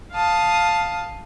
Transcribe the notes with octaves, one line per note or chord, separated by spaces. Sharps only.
F5 A5 D#6